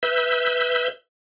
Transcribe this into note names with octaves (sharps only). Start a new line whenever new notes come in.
B4 E5 E6 G6